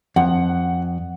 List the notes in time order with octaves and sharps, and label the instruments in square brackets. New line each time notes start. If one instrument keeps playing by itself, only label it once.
[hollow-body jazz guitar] F2 [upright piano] F#5